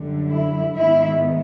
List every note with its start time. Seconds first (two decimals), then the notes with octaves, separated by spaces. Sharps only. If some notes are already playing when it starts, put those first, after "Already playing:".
Already playing: F#2 D3 G3
0.31 E4
0.75 G#2 D#3 G#3 B3 E4